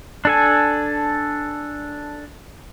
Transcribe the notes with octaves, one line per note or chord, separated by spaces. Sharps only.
D4 A4 G#5